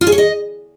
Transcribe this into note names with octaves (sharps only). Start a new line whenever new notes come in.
F4
G#4
C#5
D#5